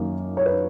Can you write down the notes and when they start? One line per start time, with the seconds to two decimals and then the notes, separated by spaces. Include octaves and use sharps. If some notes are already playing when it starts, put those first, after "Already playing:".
Already playing: F#2 D#3 A#3
0.37 C#5
0.46 B4